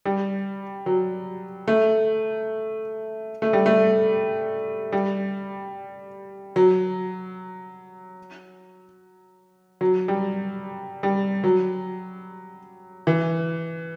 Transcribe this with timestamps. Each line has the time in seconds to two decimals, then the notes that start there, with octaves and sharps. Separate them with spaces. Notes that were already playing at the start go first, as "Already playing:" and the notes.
0.05 G3
0.86 F#3
1.68 A3
3.42 A3
3.53 G3
3.66 A3
4.92 G3
6.56 F#3
9.81 F#3
10.08 G3
11.03 G3
11.44 F#3
13.07 E3